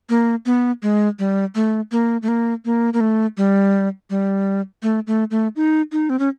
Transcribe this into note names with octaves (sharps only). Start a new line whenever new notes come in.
A#3
B3
G#3
G3
A3
A#3
A3
A#3
A#3
A#3
A3
G3
G3
A3
A3
A3
D#4
D#4
C4
C#4